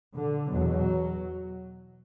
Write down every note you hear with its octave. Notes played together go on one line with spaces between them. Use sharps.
D3
E2 B2 F#3